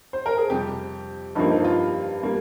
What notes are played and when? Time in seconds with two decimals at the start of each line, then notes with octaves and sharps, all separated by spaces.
0.13 C5
0.26 A#4
0.38 G#4
0.50 F2 C3 G3 G4
1.35 G2 F3 A#3 D#4
1.50 D#4
1.64 F4
2.23 G3 A#3